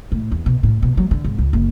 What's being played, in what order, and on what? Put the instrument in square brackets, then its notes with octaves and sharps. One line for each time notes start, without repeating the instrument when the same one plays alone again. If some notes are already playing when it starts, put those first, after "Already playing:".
[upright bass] A2
E2
B2
A2
B2
F#3
D3
G#1
C#2
F#1